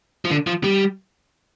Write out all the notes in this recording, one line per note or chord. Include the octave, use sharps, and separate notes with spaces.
F3
D3
F3
G3